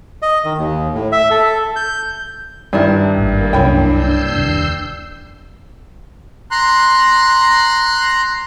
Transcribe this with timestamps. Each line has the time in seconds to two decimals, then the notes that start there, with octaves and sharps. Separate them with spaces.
0.22 D#5
0.45 D#3
0.58 D#2
0.94 A2
1.12 E5
1.31 A4
1.76 G6
2.73 G2 D#3 D4 E4
3.18 G#1 A#3
3.53 C2 F#2 C#4 D4 E4 G5
3.87 E6 G6 C7
4.36 F1 D#2 D4
6.51 A#5 C6 F#6